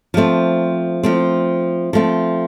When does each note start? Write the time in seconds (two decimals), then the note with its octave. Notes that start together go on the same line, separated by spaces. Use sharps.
0.14 F3 A3 C4
1.03 F3 A3 C4
1.93 F3 A3 C4